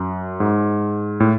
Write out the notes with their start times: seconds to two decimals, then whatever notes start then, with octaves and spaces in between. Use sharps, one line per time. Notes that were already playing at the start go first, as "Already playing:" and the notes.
Already playing: F#2
0.40 G#2
1.20 A2